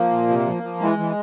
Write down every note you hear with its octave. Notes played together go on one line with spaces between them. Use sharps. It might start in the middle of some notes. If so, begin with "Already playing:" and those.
Already playing: F3 A#3
A#2
C3
F3
F3
E3 G#3
E3